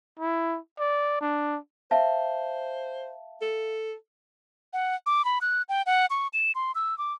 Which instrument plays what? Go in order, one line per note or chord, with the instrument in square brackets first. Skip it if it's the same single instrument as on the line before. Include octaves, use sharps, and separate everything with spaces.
[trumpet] E4
D5
D4
[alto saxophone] C5 [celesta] E5 F5 A5
[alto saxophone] A4
[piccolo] F#5
D6
B5
F#6
G5
F#5
C#6
E7
C6
E6
D6